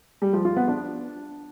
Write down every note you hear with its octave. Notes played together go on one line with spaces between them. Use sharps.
G3
F3
F4
B3
D4